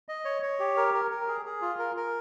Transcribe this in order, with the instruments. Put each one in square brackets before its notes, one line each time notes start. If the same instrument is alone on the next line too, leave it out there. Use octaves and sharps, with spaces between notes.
[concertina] D#5
C#5
C#5
G4
A#4
A#4
A#4
G#4
G#4
F4
A#4
A#4